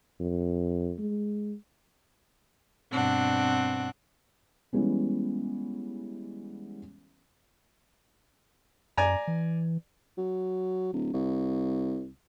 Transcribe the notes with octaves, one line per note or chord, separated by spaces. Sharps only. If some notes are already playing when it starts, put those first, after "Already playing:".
F2
G#3
G2 B2 C4 D4 F#5
E3 G3 G#3 B3 C#4
F#2 D5 G#5 A#5
E3
F#3
D1
C2